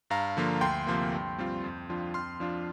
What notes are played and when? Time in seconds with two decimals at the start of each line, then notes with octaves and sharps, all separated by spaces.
0.10 G2 F5 A#5
0.37 D3 F3 A#3 F4
0.61 D2 G5 C6
0.87 C3 F3 A#3
1.12 G2
1.38 G3 C4 F4
1.64 F2
1.89 F3 D4 F4
2.14 F2 C6 F6
2.40 F3 D4 F4